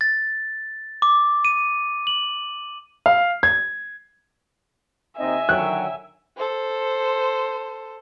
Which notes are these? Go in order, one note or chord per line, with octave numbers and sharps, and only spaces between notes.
A6
D6
D#7
F#7
F5
G#6
D#2 C4 D#4 D#5 E5 G#5
D3 D#3 F#3 G5 F#6
A4 C5